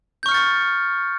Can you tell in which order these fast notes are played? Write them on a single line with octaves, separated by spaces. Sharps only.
G6 C#6 F6 C#7 A6